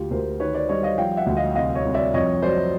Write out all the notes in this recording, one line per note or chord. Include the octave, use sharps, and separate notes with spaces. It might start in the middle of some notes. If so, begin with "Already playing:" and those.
Already playing: D2 F4 G4
D2 A#4 C5
D#3 B4 C#5
C5 D5
G3 C#5 D#5
D#5 F5
F3 F5 G5
E5 F#5
D2
D#5 F5
C2 D#5 F5
C#5 D#5
C2
D5 E5
F2 C#5 D#5
F#3 C5 D5